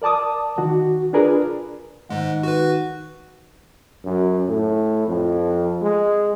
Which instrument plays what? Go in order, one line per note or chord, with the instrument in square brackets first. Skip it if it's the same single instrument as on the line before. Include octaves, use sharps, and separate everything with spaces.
[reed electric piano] A#4 D5 A5 D6 D#6
D#3 F#4
D4 F4 G#4 A#4 B4 D5
[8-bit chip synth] G#2 G#3 [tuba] D#3 [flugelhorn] F#5
[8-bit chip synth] F#4 B4
[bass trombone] F#2
A2
F2
G#3